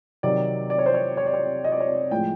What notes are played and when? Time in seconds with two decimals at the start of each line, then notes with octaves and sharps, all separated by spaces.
0.23 C3 D#3 F#3 D5
0.70 D5
0.79 C#5
0.86 C5
0.94 C#5
1.17 C#5
1.26 D5
1.34 C#5
1.64 D#5
1.72 D5
1.80 C#5
1.88 D5
2.11 A2 F3 G#3 G5